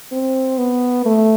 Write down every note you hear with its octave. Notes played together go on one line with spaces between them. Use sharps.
C4
B3
A3